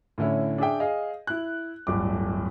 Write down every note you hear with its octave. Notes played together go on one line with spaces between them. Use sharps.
A2 D3 C#4 E4
D4 G#4 E5 G5
G#4 D#5 F5
E4 F#6
D1 G1 G2 D6